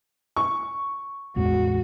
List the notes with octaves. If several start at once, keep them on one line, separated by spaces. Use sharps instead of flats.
C#6
A1 E2 G#3 F#4